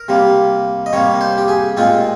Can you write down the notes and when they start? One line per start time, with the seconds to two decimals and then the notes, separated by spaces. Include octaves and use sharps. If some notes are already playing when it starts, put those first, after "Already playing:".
Already playing: A#4
0.08 C3 G3 A#3
0.86 D#5
0.93 C3 G3 A#3 C#5
1.21 C5
1.38 G4
1.48 G#4
1.77 A#2 G#3 C4 F4